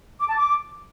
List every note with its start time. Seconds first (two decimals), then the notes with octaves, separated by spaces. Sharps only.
0.21 D6
0.29 A5
0.37 D6